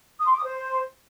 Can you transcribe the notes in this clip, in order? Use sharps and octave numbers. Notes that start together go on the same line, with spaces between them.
D#6
C6
D6
D#6
C5